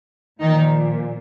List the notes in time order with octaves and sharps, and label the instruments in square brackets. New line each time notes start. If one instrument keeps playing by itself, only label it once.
[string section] A#2 D#3 F3 D#4